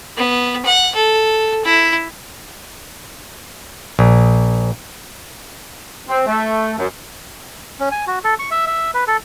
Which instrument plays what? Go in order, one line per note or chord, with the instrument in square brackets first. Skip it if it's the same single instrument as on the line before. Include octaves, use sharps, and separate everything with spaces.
[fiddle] B3
F#5
A4
E4
[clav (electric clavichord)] A#1
[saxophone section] C4
A3
F#2
[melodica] C#4
G#5
F#4
A4
C#6
E5
E5
B4
A4